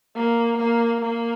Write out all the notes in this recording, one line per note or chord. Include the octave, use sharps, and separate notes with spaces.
A#3
A#3
A#3